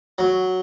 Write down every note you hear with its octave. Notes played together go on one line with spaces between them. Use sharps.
F#3